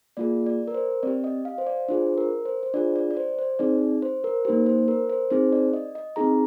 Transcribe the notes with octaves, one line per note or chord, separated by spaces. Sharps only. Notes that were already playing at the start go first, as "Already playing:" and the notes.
A#3 F4 G#4 D5
D5
A#4
C5
C4 G4 D5
D#5
F5
C5
D5
D4 F4 G#4 C5
A#4
C5
C5
D4 F4 G#4 D5
D5
D5
C5
C5
C4 D#4 G#4 D5
C5
A#4
A#3 D#4 G4 C5
C5
A#4
C5
C4 D#4 G#4 C5
D5
D#5
D#5
C4 D#4 G#4 A#5